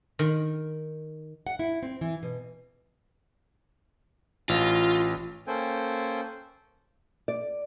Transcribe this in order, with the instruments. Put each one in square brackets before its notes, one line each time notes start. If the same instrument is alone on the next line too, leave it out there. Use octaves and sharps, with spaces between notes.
[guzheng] D#3
[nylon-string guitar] F#5
E4
C4
E3
B2
[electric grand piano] A1 [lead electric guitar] F4
[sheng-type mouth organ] A#3 C#4 A4 C5 G5 G#5
[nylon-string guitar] D5